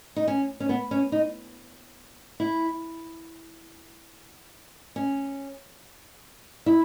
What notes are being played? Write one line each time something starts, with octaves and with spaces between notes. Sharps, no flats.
D#4
C#4
C#4
B3
C#4
D#4
E4
C#4
E4